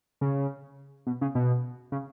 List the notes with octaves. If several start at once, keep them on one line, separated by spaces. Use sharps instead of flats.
C#3
B2
C#3
B2
C#3